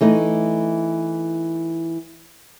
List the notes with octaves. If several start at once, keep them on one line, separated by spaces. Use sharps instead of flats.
E3 A3 D#4